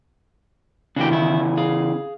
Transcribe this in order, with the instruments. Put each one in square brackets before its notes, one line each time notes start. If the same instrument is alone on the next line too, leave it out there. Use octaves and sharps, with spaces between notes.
[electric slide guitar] C#3 E3 [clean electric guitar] D4 F#4 G4
[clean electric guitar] D#3 E4
G#4 F5